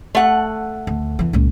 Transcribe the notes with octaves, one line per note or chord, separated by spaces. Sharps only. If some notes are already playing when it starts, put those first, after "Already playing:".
A3 F#5
D2
E2 E3
C#2 A#2